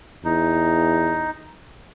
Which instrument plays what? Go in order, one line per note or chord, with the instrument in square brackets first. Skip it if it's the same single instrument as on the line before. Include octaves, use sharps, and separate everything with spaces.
[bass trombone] E2 [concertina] D#4